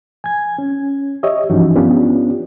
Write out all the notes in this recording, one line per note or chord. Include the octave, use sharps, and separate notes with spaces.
G#5 G#6
C#4
G4 C#5 D#5 E5
G2 E3 F3 C#4 D#4 F#4
B3 C#4 D4 F4 G4